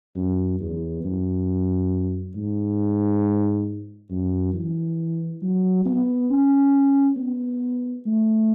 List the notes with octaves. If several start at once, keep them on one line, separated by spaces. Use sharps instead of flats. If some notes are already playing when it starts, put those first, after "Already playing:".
F#2
E2
F#2
G#2
F#2
E3
F#3
B3
C#4
B3
A3